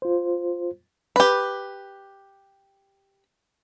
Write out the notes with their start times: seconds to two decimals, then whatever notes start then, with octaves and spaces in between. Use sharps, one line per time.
0.02 F4 C5
1.16 G4 B4